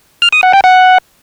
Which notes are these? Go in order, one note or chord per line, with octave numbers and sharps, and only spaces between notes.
F6
D#6
F#5
G5
F#5